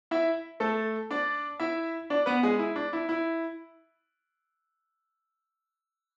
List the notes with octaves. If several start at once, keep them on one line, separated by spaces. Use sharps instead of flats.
E4 E5
A3 A4
D4 D5
E4 E5
D4 D5
B3 B4
G#3 G#4
E4
D4
E4
E4